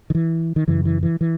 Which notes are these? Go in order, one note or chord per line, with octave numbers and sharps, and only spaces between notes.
D#3
E3
D#3
F#2 C#3 E3
E3
E3
E3